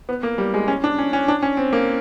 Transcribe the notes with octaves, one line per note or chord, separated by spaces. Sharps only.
B3
A#3
G3
G#3
C#4
D4
C#4
C#4
D4
C#4
C4
A#3